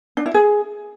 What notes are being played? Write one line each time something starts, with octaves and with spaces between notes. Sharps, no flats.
D4
E4
G#4